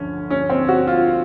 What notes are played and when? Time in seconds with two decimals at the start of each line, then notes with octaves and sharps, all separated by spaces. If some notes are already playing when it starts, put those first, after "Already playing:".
Already playing: D2 D3 F3 C#4
0.30 C#4
0.50 C4
0.69 F#4
0.87 F4